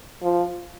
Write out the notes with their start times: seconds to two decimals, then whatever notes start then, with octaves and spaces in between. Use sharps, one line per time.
0.23 F3